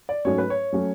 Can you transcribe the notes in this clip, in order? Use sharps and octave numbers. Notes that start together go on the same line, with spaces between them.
D5
G#2 F#3 A3 C#4 F#4 C#5
B4
C#5
F#3 A3 C#4 F#4